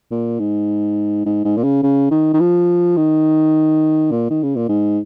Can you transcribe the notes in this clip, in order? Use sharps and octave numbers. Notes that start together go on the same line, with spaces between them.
A#2
G#2
G#2
G#2
A#2
C#3
C#3
D#3
D#3
F3
D#3
A#2
D#3
C#3
A#2
G#2